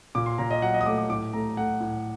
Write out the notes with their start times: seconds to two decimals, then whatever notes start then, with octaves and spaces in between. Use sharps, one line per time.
0.15 A#2 D6
0.26 C6
0.38 A#2 A#5
0.51 D#5
0.62 F#3 F#5
0.74 D#5
0.81 D#6
0.86 A3 D6
0.98 D6
1.10 A2 D6
1.33 A3 A#5
1.57 A3 F#5
1.80 A2